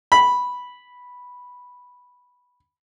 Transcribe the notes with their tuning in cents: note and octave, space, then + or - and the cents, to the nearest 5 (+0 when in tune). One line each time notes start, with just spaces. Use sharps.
B5 -5